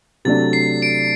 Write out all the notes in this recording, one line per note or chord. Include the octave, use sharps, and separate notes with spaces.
C3 F#3 A3 D4 A6
C7
D7